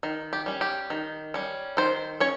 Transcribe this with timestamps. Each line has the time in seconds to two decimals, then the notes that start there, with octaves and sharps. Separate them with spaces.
0.03 D#3
0.33 G4
0.46 G3 C#4
0.61 G4
0.90 D#3
1.34 G3 C#4
1.77 D#3 C5
2.20 C#4 C#5